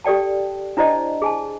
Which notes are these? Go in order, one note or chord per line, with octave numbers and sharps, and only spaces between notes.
G4 A4 D5 G5 A5
D4 E4 C5 D5 D#5 A5
G#4 G#5 A5